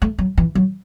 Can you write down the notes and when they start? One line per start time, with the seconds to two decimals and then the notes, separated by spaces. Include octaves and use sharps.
0.02 A3
0.18 F#3
0.38 E3
0.55 F#3